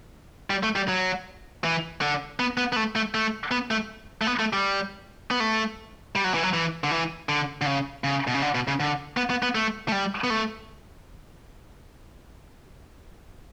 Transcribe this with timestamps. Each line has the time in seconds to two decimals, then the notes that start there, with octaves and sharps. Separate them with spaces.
0.50 G3
0.63 A3
0.76 G3
0.88 F#3
1.64 E3
2.01 D3
2.39 B3
2.57 B3
2.72 B3
2.76 A3
2.96 A3
3.14 A3
3.51 B3
3.71 A3
4.21 A3
4.27 B3
4.39 A3
4.53 G3
5.31 B3
5.40 A3
6.16 G3
6.24 F#3
6.34 E3
6.43 F#3
6.53 E3
6.84 D3
6.91 E3
7.29 D3
7.61 D3
7.66 C#3
8.04 C#3
8.27 B2
8.34 C#3
8.42 D3
8.55 B2
8.68 C#3
8.80 D3
9.17 B3
9.30 B3
9.43 B3
9.55 A3
9.88 A3
9.92 G3
10.24 B3
10.30 A3